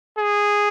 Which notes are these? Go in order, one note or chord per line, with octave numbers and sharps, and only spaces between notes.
G#4